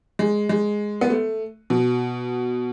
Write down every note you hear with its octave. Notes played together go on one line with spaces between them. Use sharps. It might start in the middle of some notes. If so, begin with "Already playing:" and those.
G#3
G#3
B3
A3
B2